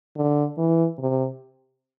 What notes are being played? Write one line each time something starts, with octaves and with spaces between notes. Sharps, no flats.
D3
E3
C3